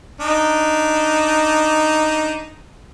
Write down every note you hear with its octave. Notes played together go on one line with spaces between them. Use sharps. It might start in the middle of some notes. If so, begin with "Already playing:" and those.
D4 D#4